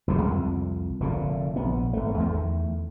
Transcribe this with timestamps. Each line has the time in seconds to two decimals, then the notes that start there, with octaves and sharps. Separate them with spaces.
0.07 F#1 D2 D3 G#3
0.22 C2 F2
1.00 F1 A#2 D3
1.56 A#1 B3
1.93 G#1 A3
2.18 E2 D#3 A3